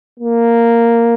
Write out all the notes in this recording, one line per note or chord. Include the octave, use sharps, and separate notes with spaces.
A#3